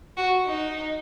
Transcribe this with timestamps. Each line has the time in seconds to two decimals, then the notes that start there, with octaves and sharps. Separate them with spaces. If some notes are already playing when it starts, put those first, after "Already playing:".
0.17 F#4
0.46 D#4